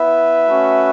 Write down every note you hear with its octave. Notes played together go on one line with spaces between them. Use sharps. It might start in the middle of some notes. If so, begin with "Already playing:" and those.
Already playing: B3 E4 B4 E5
A3 C#4 F#4